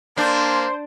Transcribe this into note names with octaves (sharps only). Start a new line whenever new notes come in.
A#3 D4 C5 A5